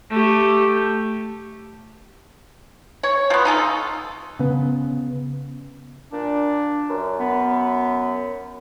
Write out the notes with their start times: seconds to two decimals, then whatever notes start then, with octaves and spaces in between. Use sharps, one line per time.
0.10 A3 G4
3.03 C#5
3.30 F3 B3
3.45 D#4 F4 G#4 A4
4.39 C#3 B3
6.12 A#2 D4
6.90 F#2
7.20 B3